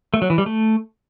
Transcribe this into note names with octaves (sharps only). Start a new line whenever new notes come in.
A3
F#3
E3
G3
A3